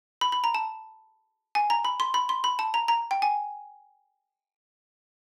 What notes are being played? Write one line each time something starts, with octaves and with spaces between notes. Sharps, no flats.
B5
B5
A#5
A5
G#5
A#5
B5
C6
B5
C6
B5
A5
A#5
A#5
G5
G#5